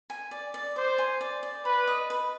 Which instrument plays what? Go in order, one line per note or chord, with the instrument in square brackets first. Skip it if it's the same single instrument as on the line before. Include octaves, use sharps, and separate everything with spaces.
[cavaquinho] G#5
D5
D5
[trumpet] C5 [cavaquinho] D6
[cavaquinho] G#5
D5
D5
[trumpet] B4 [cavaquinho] B5
[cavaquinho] D#5
B4